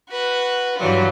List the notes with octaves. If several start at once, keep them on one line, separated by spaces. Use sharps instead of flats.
F#4 B4
G2 E3 F#3 G3 F4